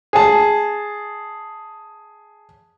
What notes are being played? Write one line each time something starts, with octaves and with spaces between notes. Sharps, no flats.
G#4 A5